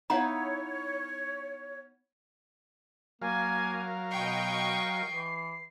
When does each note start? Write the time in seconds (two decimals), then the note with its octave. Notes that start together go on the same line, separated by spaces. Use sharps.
0.10 B3 D#4 E4 C#5 F5 F#5 A#5
3.22 F#3 A#3 A#4 F5 G#5
4.11 B2 D#5 G5 C#6 C7
5.10 E3